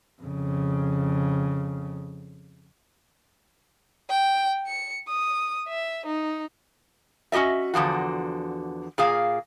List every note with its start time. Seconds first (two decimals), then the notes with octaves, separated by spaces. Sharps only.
0.22 F2 C#3
4.10 G5
4.67 C#7
5.08 D#6
5.68 E5
6.06 D#4
7.32 C#4 F#4 G4 D#5 E5
7.74 E2 D3 F3 F#4
8.98 A#2 G#4 F5